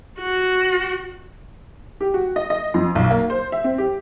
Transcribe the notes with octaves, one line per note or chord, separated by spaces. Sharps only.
F#4
G4
F#4
D#5
D#5
F2
B1
A#3
C5
E5
C4
G4